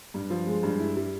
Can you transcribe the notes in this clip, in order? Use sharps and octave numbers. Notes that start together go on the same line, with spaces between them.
G2
F3
G#3
G2
E4
G3